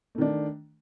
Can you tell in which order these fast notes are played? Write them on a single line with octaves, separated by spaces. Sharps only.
A3 D#3 D4